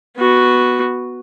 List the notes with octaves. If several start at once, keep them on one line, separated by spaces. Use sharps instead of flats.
B3 F#4